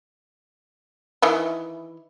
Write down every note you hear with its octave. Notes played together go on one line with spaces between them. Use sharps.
D#3 E3 E4